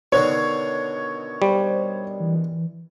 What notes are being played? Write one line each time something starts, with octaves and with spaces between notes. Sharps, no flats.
B2 D3 D#3 C#5
G3 C5
E3